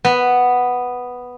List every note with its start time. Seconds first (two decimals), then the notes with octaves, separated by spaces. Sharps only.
0.05 B3